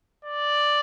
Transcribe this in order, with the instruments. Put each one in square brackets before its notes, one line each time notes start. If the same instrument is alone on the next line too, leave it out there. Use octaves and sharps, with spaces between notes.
[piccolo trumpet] D5